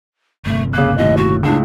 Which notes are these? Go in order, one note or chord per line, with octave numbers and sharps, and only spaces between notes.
G1 C3 A3
C#3 A#3 F#6
D#2 A2 D#5
F#4
C#2 A2 D4